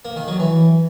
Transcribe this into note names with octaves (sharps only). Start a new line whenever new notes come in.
A#3
D#3
F#3
E3